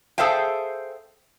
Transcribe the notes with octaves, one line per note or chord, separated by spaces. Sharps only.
G#4 A4 C5 E5 F5 G5